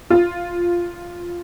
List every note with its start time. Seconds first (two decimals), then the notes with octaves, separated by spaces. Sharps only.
0.10 F4